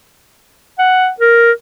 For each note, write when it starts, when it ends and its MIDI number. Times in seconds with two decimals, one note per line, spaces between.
0.78 1.09 78
1.20 1.52 70